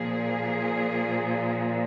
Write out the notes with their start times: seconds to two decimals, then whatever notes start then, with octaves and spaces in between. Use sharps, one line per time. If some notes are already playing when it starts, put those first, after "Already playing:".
Already playing: A#2 F3 G#4